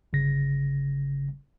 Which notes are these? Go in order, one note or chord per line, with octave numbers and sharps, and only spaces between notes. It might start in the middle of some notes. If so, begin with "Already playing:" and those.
G1 C#3 A#6